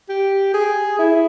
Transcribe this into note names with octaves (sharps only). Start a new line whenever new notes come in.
G4
G#4
E4